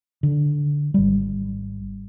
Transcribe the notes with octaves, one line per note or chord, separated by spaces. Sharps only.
D3
G#1 G3